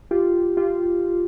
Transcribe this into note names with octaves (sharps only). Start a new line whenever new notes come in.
F4 G4
F4 G4